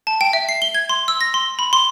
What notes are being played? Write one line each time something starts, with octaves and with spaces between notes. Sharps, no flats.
A5
G5
E5
C7
G7
G#6
C6
E6
A#6
C6
B5
C6